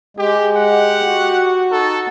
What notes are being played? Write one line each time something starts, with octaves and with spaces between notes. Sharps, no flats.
G#3 G4
G4 F#5
F#4
D#4 A4